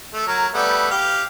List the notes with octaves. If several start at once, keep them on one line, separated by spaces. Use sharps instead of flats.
A3
F#3 A#4
G3 A3 B3
G4 F5